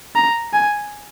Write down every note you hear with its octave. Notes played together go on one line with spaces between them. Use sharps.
A#5
G#5